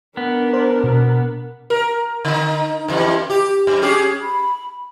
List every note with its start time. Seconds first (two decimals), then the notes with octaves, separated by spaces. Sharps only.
0.17 B3 D4 A#4
0.53 C5
0.84 B2
1.70 A#4
2.25 D3 D#4
2.88 F2 E3 G3
3.30 G4
3.67 F#2
3.82 C#4 G4 G#4
4.22 B5